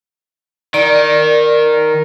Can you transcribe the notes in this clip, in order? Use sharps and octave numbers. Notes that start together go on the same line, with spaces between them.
D#3 D5